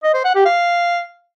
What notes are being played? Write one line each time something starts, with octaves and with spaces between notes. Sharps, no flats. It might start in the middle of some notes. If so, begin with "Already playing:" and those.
D#5
C5
F#5
G4
F5